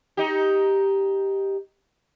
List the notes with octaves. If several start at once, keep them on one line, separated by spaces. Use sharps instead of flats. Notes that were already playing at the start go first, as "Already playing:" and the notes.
D#4 G4